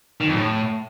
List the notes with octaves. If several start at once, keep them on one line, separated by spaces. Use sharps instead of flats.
D#3
F2
A2